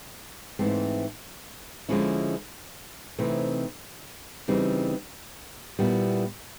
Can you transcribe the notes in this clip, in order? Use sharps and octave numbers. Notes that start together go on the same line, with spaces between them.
G#2 E3 A3 C4
D3 F3 G#3 C#4 E4
C3 E3 A3 C4 D#4
C#3 E3 G3 C4 D#4
A#2 G3 B3 E4